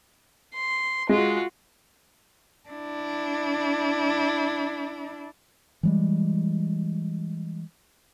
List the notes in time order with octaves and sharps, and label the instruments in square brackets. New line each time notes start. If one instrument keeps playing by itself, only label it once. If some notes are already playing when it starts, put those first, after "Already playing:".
[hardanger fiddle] C6
[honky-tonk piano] G#3 [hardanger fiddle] F4 F#4
[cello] D4 E4
[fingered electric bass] E3 G3 G#3